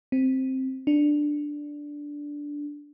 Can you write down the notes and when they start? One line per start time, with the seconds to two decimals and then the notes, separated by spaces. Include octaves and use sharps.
0.12 C4
0.87 D4